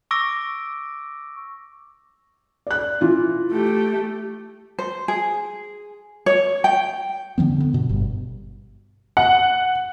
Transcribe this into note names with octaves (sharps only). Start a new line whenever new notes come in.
C#6 D6 E6 A#6 D7
D5 F#6
E3 F4
A3 G4
C5
G#4
C#5
G5
D3 E3 F3 B3
D3 B3
G2 B2
G1 G2
F#5